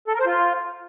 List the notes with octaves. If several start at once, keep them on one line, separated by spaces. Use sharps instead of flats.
A4
A#4
C5
F4